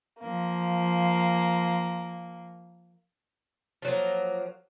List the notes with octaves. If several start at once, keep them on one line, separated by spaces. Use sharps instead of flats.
F3 A#3
F3 F#3 A#3